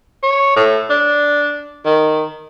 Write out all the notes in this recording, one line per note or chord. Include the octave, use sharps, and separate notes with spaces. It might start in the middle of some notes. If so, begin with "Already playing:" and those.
C#5
A2
D4
D#3